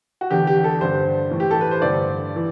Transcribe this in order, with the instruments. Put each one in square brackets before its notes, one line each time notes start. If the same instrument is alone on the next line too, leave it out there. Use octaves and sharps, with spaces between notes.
[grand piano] F#4
E2 D3 G4
G4
A4
G2 D3 C5
A2 E3
G4
A4
B4
C5
G2 D3 D5
E3